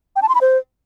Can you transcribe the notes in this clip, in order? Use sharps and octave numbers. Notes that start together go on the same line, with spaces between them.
G5
A5
C6
B5
C5